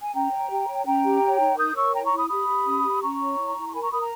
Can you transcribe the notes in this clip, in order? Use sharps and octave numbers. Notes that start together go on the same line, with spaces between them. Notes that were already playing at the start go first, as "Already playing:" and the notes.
G#5
C#4 G5 A#5
C#5
G4
C#5
C#4 G5 A#5
G4
C#5
D#4
A#4 D#6 G6
C#5 C#6 E6
E4 G5 A#5
A#5 C#6
E4
B5 D#6
G4 B5 D#6
G4
C#4
G4
C#4 A#5 C#6
C#5
E4
E4
C#6
A#4 G#5 B5
A#5 C#6
A#4 B5 D#6
A#5